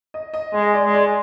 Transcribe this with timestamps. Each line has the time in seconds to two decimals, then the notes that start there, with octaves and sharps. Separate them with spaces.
0.14 D#5
0.34 D#5
0.53 G#3 D#5
0.74 D5
0.84 G#3
0.94 D5